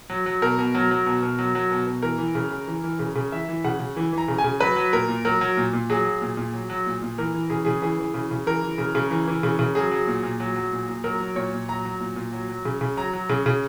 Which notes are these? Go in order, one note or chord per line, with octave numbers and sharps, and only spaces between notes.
F#3
F#3
B2 A#4
B2
F#3
F#3
B2
B2
F#3
F#3
B2
B2
E3 A#4
E3
C#3
C#3
E3
E3
C#3
C#3
E3 E5
E3
C#3 F#5
C#3
E3
E3
A#5
C#3
G#5
C#3
F#3 B4
F#3
A#2 A#4
A#2
F#3 A#4
F#3
A#2
A#2
F#3 G#4
F#3
A#2
A#2
F#3
F#3
A#2
A#2
E3 A#4
E3
C#3 G#4
C#3 G#4
E3 G#4
E3
C#3
C#3
E3 A#4
E3
C#3
C#3
E3
E3
C#3
C#3
F#3 G#4
F#3
A#2
A#2
F#3
F#3
A#2
A#2
F#3 A#4
F#3
A#2 C#5
A#2
F#3 A#5
F#3
A#2
A#2
F#3
F#3
C#3
C#3
F#3 A#5
F#3
C#3
C#3